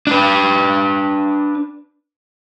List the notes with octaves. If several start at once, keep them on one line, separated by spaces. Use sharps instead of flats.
D4 B4